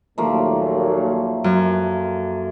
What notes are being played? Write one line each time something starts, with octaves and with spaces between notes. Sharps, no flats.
D#2 A#2 F3 F#3 A3 A#3
F#2